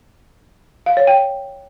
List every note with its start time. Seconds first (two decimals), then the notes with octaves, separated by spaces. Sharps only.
0.86 F5
0.97 C#5
1.07 G5